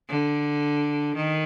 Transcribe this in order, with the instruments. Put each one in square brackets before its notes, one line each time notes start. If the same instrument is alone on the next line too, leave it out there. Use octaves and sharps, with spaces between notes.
[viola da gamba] D3
D#3